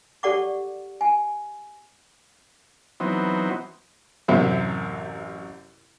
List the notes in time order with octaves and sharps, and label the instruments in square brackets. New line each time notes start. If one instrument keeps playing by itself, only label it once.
[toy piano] G4 A4 D5 F#5 C#6 D6
G#5
[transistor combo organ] E3 F#3 B3 C4 D#4
[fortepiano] A1 F#2 C3 C5 E5